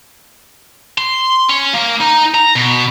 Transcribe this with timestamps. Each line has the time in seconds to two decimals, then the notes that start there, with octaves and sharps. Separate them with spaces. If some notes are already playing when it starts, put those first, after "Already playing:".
0.98 C6
1.50 C#4
1.74 A#3
2.01 D#4
2.34 A#5
2.56 B2